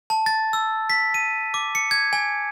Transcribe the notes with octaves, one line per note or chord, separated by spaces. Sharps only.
A5
A6
E6
B6
D#7
D6
C#7
G#6
G#5